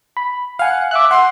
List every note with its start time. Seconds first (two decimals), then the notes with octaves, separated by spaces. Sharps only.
0.17 B5
0.59 F5 F#5 G#5
0.91 E5 D6 F#6
1.11 F#5 C6